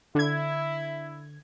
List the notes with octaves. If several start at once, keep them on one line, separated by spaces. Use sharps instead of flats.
D3 E4 G#6